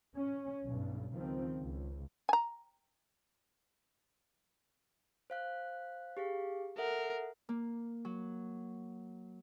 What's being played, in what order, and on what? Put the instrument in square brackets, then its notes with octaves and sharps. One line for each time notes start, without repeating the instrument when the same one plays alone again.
[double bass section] C#4
B1 G2
C#2 D#3 F3 C4
C#2
[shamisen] G#5 A#5
[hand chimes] C5 F5 F#6
G4 G#4 F5
[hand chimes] A4 E5 F#5 [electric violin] A#4
[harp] A#3
F#3